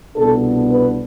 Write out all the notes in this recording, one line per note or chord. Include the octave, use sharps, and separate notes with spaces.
C2 B2 B3 D4 A4
B4